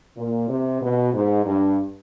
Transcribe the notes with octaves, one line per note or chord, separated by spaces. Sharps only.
A#2
C3
B2
G#2
G2